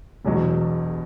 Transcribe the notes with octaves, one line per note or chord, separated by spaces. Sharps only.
E1 E2 B2 F#3